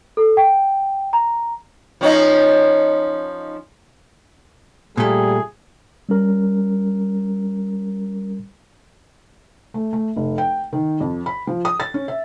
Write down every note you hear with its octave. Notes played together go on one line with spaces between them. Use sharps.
A4
G5
A#5
F3 C#4 D#4
A#2 G3 A3 G#4
G3 C#4 A#4
A3
A3
F1
G5
D#3
F2
B5
F3
D#6
A6
C#4
E5